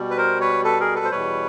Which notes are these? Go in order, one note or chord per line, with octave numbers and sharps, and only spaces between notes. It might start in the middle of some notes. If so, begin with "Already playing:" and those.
Already playing: B2 G3
B4
A#4 C5
B4 C#5
A4 B4
G#4 A#4
A4 B4
C5
E2 B2 G3 B4 C#5